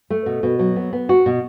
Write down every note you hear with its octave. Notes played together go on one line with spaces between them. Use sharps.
A3
B2
B2
F#3
B3
B3
F#4
B2